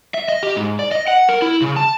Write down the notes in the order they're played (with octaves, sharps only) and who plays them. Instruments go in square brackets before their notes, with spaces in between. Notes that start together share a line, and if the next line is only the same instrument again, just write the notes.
[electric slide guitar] E5
D#5
G4
G#2
D5
D#5
F#5
A#4
E4
C#3
A5